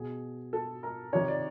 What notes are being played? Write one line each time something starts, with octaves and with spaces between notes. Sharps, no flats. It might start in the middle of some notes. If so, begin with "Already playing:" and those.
Already playing: B2 G#4
A4
A#4
C3 D#3 C#5
D5